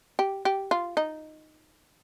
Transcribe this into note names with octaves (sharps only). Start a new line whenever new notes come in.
G4
G4
F4
D#4